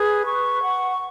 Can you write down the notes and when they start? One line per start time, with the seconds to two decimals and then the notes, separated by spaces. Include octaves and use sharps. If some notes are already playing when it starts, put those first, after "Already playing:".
Already playing: G#4 B4
0.27 C#6
0.62 F#5